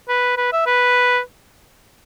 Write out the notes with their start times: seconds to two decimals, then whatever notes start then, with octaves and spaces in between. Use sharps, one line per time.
0.09 B4
0.37 B4
0.52 E5
0.66 B4